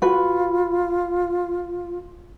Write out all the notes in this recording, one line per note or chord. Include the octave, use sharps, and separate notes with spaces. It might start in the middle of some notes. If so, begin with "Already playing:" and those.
F4 F#4 B4